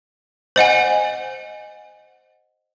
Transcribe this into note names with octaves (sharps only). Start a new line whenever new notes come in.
C5 D#5 F#5 G#5